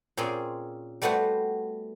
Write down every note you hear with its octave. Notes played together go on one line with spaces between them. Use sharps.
A#2 C4 C#4 G#4 C6
G3 A3 B3 F#4 C5